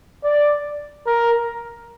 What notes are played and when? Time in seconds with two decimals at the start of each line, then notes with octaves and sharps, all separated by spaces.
0.24 D5
1.06 A#4